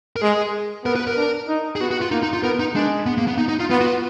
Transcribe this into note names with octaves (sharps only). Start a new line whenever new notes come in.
A#4
G#3 G#4
B3 A#4
B4
A#4
D4
D#4
G#4
B3 F#4
F#4
F4
A#3 D#4
D#4
F4
B3 A#4
D#4
G#3 D4
B3
A#3
B3
D#4
D#4
F4
B3 F4
F#4
F4